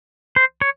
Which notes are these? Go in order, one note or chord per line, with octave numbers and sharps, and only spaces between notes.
C5
C#5